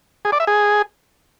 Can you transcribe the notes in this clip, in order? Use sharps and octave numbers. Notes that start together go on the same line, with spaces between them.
G#4
D5
E5
G#4